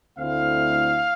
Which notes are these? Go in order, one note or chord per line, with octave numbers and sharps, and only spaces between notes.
D2 D3 A3 C4 E4 F5